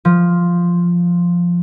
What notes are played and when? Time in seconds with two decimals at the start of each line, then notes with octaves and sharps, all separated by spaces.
0.05 F3